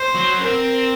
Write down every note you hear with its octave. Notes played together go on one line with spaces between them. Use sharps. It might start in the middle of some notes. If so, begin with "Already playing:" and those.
Already playing: C5
F#3
C#4
C4 A#4